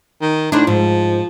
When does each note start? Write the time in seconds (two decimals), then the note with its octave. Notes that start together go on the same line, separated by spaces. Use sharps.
0.22 D#3
0.52 A2 D4 D#4 C5
0.67 G#2 F3